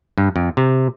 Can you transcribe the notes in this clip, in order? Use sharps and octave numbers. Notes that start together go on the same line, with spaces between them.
G2
F2
C3